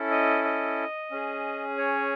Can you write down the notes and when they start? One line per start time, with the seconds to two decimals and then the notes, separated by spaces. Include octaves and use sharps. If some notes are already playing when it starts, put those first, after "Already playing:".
Already playing: C#4 E4 A4
0.11 D#5
0.44 D#5
1.11 C#4 G#4
1.78 C#5